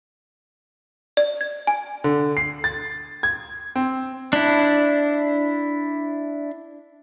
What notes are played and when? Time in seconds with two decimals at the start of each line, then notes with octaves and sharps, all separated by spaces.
1.17 D5
1.41 G#6
1.67 G#5
2.04 D3
2.37 C7
2.64 A6
3.23 G#6
3.76 C4
4.33 D4 E4